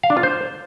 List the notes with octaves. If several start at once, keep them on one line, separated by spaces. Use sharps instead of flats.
F5
D4
F4
C5